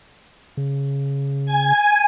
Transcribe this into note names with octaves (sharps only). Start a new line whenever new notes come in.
C#3
G#5